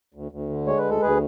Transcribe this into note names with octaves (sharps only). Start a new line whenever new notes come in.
D2
D2
D3
G#3 C#5
B4
D2
A4
D2 G#4 B4